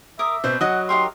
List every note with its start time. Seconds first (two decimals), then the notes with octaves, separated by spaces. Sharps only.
0.19 A#4 E5 D6 D#6
0.44 B2 C4 B4 C5
0.61 F#3 D#5 F#5 D#6
0.89 D#4 G4 A#4 C6